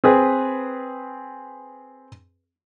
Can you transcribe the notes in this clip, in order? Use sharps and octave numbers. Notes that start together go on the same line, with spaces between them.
C4 G#4 B4